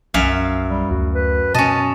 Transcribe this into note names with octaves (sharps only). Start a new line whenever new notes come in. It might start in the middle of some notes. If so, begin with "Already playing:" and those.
B1 F#2 E5 F5
G3
D2 F#4
B4
B2 C#4 D#5 A5